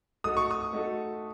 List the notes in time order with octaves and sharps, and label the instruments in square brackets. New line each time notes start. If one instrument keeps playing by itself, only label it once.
[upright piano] A3 D#4 F#4 A4 [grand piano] D#6
[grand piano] C#6
D#6
[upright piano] A3 D#4 F#4 A4